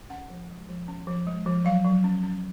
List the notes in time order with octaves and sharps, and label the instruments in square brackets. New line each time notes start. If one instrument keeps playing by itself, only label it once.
[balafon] C#4 F#5
F3
G#3
F3
C#4
F3
G#3
F3
F#3 F5
F#3
C#4
C#4